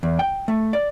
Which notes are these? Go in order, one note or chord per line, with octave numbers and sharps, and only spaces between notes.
E2
G5
A3
D5